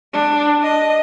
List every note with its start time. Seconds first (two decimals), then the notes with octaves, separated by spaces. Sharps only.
0.13 D4
0.62 D#5